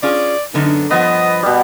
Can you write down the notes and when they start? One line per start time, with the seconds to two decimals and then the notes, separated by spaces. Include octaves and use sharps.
0.03 C#4 F4 G#4 D5
0.54 F#2 D3 B3 D#4
0.91 G2 F3 B3 D#5
1.43 B2 G3